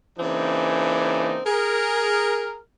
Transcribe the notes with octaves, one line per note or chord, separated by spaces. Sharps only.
C#3 E3 A#3 C4 D4 D#4
G#4 A#4